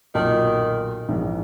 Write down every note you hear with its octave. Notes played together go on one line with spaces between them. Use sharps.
B1 A#2 D#3 F#3
A#1 G#2 E3